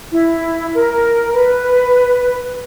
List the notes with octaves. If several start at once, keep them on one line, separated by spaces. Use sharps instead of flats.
E4
A#4
B4